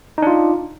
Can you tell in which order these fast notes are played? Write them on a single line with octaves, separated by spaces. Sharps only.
D#4 D4 F4